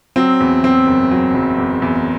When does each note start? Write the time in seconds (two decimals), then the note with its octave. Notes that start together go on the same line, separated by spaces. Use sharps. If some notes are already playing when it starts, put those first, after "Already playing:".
0.16 F#3 C4
0.40 E2
0.63 F#3 C4
0.87 F#1
1.11 F#3
1.34 F#1
1.58 E2
1.82 E2